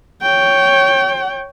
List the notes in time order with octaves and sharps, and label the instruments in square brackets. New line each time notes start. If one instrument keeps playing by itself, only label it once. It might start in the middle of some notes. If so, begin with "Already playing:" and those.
[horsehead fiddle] C#5 G5